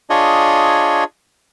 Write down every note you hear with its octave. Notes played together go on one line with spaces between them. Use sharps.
D4 F4 G#4 C#5 D#5